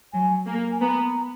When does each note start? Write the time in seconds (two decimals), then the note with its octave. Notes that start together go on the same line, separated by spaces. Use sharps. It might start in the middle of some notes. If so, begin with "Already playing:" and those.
0.13 F#3 G#5
0.47 A#3
0.72 G#5
0.81 B3 A#5